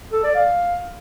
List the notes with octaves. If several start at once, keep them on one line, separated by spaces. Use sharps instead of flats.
A4
D5
F5